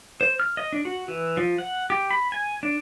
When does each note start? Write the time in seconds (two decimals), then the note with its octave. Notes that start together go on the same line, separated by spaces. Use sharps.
0.21 C5
0.40 F6
0.57 D#5
0.73 D4
0.85 F#4
1.08 E3
1.37 F3
1.58 F#5
1.90 G4
2.11 B5
2.32 G#5
2.63 D4